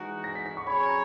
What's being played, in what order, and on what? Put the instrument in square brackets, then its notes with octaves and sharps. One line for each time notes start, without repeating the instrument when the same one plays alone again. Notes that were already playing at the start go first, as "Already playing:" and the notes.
Already playing: [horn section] E3 G#3 D#4 F#4
[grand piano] A#6
B6
B6
C#6
[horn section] F#3 C#4 G#4 C#5 [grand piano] B5
[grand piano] A#5